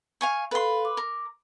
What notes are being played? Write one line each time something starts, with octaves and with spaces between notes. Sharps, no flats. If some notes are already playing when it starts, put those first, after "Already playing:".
F5 G#5 C#6
A4 B4 F5 B5 C6
D6
A#4